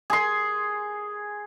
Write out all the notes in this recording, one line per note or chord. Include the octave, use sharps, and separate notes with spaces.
G#4 C6